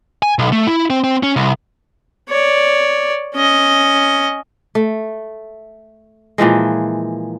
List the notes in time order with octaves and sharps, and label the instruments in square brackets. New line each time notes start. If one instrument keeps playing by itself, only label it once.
[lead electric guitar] G#5
B1
A3
E4
C4
C4
C#4
C2
[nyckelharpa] C#5 D5
C#4 D#5
[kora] A3
A#2 E3 F3 G#3